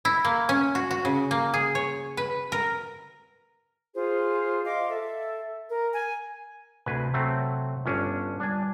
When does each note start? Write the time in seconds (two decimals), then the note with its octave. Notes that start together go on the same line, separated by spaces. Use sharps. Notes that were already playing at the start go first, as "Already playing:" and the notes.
0.05 E4
0.25 A#3
0.49 C#4
0.75 F#4
0.91 F#4
1.05 C#3
1.31 A#3
1.54 G#4
1.75 C#5
2.17 B4
2.52 A#4
3.94 F4 G#4 C5
4.65 D#5 F5 C6 D6
4.90 A4 E5
5.70 A#4
5.94 G#5
6.86 D2 C3 B4 G#5
7.14 F#3 A3 C4
7.86 G1 C#4 D4 F4
8.40 G3 D4 G#5